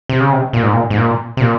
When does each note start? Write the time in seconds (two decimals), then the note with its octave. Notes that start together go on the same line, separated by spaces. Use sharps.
0.09 C3
0.20 C#3
0.32 C3
0.53 A#2
0.63 G#2
0.73 A#2
0.90 G#2
0.98 A#2
1.37 C3
1.41 A#2